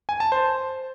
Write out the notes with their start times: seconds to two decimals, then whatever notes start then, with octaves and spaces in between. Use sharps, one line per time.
0.09 G#5
0.20 A5
0.32 C5